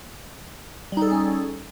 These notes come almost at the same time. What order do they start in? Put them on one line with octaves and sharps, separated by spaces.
G3 D#4 A4 G#4 C#4